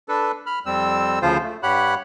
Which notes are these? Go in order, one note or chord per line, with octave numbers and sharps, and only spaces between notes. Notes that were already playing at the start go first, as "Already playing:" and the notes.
D4 A4 B4
B5 F6
F2 G3 C4 E6
D2 C#3 F3 F4 C5
A3
G2 G4 C#5 F#5 B5 F#6